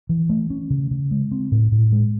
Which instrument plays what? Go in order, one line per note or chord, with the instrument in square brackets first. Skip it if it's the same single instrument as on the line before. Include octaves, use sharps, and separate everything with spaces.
[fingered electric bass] E3
A3
C#4
C#3
C#3
G#3
C4
A2
A2
G#3